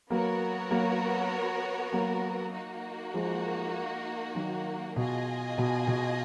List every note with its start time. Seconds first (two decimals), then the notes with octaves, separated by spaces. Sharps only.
0.10 F#3 A#3 B3 F#4 A#4 C#5
0.71 F#3 A#3
1.92 F#3 A#3
2.53 A#3 D#4 F#4
3.14 F3 G#3
4.35 D#3 F#3
4.96 B2 F4 G#4 D#5 G#5
5.58 B2
5.87 B2